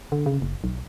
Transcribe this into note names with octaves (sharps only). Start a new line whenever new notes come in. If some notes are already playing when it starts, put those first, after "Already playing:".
D3
C#3
F#1
B1